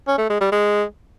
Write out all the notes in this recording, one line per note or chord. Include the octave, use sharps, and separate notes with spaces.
C#4
A3
G#3
G3
G#3